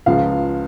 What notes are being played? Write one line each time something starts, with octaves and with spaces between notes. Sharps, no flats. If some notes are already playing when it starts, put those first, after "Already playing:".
C#2 C#3 F3 F5